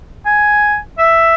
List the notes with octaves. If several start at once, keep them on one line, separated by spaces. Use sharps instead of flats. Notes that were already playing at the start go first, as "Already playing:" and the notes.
G#5
E5